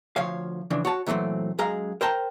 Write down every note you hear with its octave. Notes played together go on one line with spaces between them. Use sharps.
D2 F3 C#5 F5
C#3 E3 F3 D4
F#4 C#5 A5
A#2 E3 F#3 A3 C4
F#2 G#3 G#4 F5 A#5
A#4 C5 G5 A5 A#5